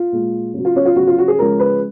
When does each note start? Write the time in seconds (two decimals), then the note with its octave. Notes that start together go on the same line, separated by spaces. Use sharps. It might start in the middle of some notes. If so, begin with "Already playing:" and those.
Already playing: F4
0.12 A#2 G#3
0.54 C#3 F#3
0.65 F4
0.76 C#4
0.85 F4
0.96 C#3 F#3 F#4
1.07 F4
1.18 F#4
1.28 G#4
1.39 C#3 F3 G#3 A#4
1.60 B4